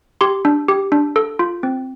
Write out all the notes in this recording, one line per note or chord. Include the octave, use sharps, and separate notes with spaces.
G4 C6
D4
G4
D4
A4
F4
C4